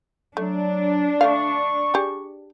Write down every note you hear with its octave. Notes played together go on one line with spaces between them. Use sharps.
F#3 A3 D4
D3 A3 F5 C#6
G4 G#4